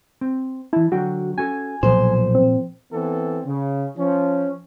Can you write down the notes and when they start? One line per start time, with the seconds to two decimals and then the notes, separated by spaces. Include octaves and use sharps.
0.21 C4
0.73 E3 E4 A5
0.92 D3 F#3 F#4 G5
1.38 C#4 F#4 A4 G#5
1.83 B1 A#2 F3 A4 C5
2.35 C4
2.92 E3 B3 C4 A4
3.45 C#3
3.97 F3 C#4